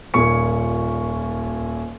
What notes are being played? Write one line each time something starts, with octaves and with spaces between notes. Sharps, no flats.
D#1 A#2 A#3 C#6 C#7